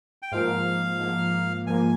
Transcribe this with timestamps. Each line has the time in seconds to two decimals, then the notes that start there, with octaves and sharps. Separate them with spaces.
0.22 G5
0.32 G#2 F3 A#3 F5
1.00 G#2 F3 A#3
1.66 G#2 F3 A#3 G#5